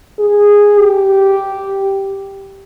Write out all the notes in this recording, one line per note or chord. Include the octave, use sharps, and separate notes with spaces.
G#4
G4